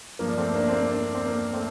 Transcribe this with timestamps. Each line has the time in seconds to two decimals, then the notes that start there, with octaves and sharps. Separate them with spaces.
0.19 G2 F3 A#3
0.29 D4
0.37 A3 C4
0.55 A#3 D4
0.69 C4
0.73 A#3 D4
0.91 A#3 D4
1.03 D4
1.15 C4
1.26 A#3
1.53 A3 C4